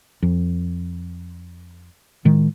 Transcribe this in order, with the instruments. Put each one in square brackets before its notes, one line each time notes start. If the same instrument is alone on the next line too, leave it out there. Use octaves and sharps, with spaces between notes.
[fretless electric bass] F2
A2 D#3 G#3